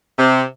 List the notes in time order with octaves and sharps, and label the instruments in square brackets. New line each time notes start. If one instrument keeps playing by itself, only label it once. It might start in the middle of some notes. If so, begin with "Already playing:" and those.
[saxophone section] C3